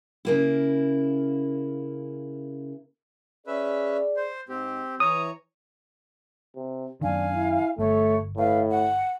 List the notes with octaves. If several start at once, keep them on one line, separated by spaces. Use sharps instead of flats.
C#3 A#3 E4
C#4 G#4 B4 D5 E5
C5
G#2 C4 G4
E3 C#5 A#5 D#6
C3
F#2 D#3 D4 F5 G#5
E4
G1 A3 C#5
A2 B4 F5
F#5